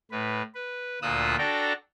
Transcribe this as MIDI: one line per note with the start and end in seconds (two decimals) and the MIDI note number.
0.11 0.42 45
0.11 0.42 71
0.55 0.99 71
1.02 1.36 38
1.02 1.36 46
1.02 1.36 65
1.02 1.36 87
1.02 1.36 88
1.02 1.36 90
1.38 1.73 62
1.38 1.73 66
1.38 1.73 69
1.38 1.73 74
1.38 1.73 79
1.38 1.73 82